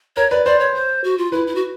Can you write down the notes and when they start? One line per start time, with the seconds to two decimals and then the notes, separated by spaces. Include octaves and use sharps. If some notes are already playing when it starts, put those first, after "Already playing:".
0.16 A#4 C#5
0.30 B4 D5
0.45 C5 D5
0.59 C#5
0.75 C5
1.04 F#4
1.18 F4
1.32 E4 B4
1.47 E4
1.55 F#4